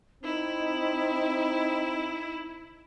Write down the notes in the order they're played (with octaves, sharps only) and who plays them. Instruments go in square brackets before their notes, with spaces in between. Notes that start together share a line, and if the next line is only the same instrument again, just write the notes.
[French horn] C4 [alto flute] D#4 [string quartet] E4